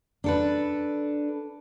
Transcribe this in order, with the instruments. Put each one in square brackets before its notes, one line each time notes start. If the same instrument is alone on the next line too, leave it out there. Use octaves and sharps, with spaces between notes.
[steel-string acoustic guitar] D4 A4 B4